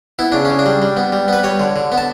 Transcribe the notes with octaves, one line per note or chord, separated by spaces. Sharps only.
B3 E4
C#3 D4
C#3 C#4
D4
G3
G3
B3
G3
B3 B4
G3 C#5
D3
D3
B3
A5